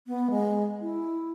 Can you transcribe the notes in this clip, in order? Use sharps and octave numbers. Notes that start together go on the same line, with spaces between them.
B3
G#3
E4